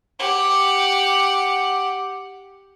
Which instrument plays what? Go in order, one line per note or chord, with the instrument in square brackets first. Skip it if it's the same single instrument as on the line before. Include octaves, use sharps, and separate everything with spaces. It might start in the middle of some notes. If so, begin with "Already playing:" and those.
[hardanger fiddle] G4 F#5